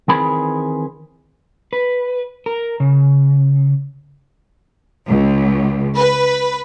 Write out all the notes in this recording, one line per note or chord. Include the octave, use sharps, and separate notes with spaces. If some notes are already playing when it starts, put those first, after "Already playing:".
D#3 E3 C4 G#4 B5
B4
A#4
C#3
C#2
B4